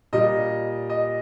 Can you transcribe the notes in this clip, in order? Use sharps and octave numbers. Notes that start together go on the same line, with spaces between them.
A#2 G3 D#5
D#5